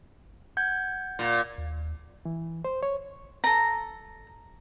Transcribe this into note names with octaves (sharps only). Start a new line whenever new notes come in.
F#5 G6 G#6
A#2
D#2
E3
C5
C#5
A4 A#5